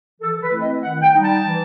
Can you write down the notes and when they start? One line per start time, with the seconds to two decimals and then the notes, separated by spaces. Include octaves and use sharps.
0.20 E3 A4
0.42 B4
0.52 A3 C4 E4
0.62 D#5
0.82 D#3 F#5
1.02 G5
1.13 G3 D#4
1.23 A5
1.43 E3